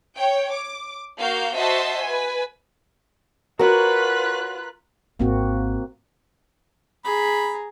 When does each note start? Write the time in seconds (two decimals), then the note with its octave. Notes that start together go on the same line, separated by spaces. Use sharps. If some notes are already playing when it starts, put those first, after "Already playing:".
0.17 C#5 G5
0.52 D6
1.19 A#3 F#4 F5 G6
1.55 F#4 C5 D#5 E5 A5 C6
2.02 B4 G#5
3.59 F4 F#4 A#4 B4 C#5 F#6
5.19 G#1 A#3 C4 F#4
7.05 G#4 A#5 B5